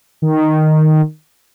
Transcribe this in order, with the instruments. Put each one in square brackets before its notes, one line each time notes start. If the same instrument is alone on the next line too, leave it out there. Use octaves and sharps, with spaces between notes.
[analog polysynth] D#3